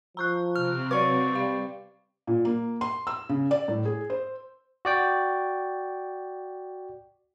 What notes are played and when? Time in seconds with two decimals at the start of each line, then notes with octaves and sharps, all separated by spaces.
0.17 F3 A#5 C#6 F#6
0.56 C3 C4 F6
0.91 F#3 B4 D5 C#6 D6
1.35 G3 F5
2.27 A#2
2.45 A#3
2.81 C6
3.07 E6
3.29 C#3
3.51 D5
3.68 A2
3.85 G#4
4.10 C5
4.85 F#4 D5 G5